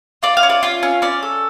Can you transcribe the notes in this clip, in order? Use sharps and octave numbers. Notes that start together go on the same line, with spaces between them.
F4 D5
F5
C#4
D5
F4
C#4
C#4 D5
A4